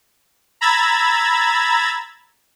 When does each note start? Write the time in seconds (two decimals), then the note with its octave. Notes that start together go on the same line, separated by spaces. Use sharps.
0.61 A#5 B5 E6 G#6 A6